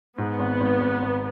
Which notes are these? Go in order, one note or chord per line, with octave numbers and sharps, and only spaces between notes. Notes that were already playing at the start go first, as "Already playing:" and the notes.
G#2 B3
G#1
G#1
G#1
G#1